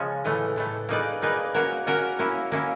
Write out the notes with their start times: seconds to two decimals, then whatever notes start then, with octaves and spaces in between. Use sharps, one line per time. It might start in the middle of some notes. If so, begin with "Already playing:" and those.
Already playing: C#3 F3 G#3 C#4
0.24 A2 E3 A3
0.56 A2 E3 A3
0.89 A#3 D#4 G#4 B4 D5
1.22 A#3 D#4 G#4 B4 D5
1.54 A#3 C#4 F#4 A#4 C#5
1.87 A#3 C#4 F#4 A#4 C#5
2.19 A#3 C#4 E4
2.52 A#3 C#4 E4